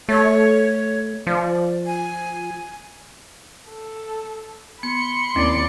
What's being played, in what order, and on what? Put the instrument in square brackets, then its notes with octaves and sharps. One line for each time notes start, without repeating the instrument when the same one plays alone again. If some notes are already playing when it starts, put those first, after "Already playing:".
[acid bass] A3 [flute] C#5
[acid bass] F3 [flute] D5
[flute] G#5
[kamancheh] A4
[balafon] B3 [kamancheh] B5 C6 [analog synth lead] C#7
[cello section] D#2 D5 [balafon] C4 C#4 E4